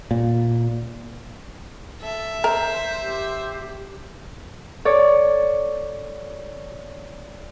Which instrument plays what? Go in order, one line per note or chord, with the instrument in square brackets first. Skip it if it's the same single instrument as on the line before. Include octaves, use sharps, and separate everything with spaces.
[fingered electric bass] A#2
[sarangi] A4 [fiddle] E5
[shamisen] A#4 [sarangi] C5
[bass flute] G4
[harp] A4 C#5 D5